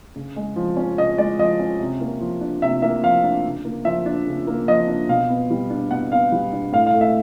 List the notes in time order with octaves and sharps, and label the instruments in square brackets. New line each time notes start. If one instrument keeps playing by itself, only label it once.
[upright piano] C#3
G#3
F3
C#4
C#3 D#5
G#3 D5
F3 D#5
C#4
C3
A#3
F3
D4
C3 E5
A#3 E5
F3 F5
D4
C#3
A#3
F3 E5
D4
C#3
A#3
F3 D#5
D4
B2 F5
B3
G3
D4
B2 F#5
B3 F5
G3
D4
A2 F5
F5
A3
E5